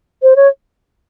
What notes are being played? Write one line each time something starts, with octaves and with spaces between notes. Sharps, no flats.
C5
C#5